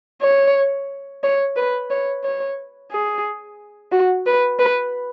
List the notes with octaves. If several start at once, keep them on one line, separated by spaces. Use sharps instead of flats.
C#5
C#5
B4
C#5
C#5
G#4
F#4
B4
B4